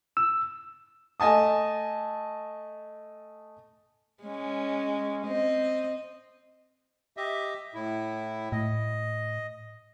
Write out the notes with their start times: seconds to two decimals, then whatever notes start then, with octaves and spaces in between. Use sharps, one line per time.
0.17 E6
1.20 A3 D#5 G#5 A5 D#6
4.23 G#3 C#4
5.27 C4 D#5
7.17 G4 D#5 E5
7.74 A2 E4
8.52 A2 D#5